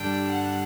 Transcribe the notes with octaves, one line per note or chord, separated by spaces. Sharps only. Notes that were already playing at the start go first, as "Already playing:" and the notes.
Already playing: G2 D3 G3 D4 G5
F#5